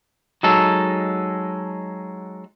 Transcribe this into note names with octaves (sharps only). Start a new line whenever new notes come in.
F#3 G#3 D#4 A4